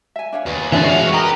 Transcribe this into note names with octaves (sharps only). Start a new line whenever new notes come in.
E5 G#5
D4 C#5 F5
D#2 B4 G#5
E3 G3 D4 F4 G#4 C#5 E5 G#5
G#3 B3 F#4 F5
C#4 D4 G4 A#4 B4 D#5